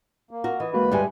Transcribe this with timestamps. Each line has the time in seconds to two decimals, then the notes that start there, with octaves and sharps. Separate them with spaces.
0.31 A#3
0.44 F#4 A#4
0.60 E3 D#5
0.74 D2 G#3 A#3 F#4 B4 B5
0.92 G2 G3 G#3 G4 E5 G#5